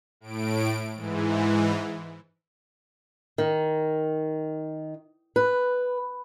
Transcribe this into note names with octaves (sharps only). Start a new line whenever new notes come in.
A2 D7
G#2 E3
D#3
B4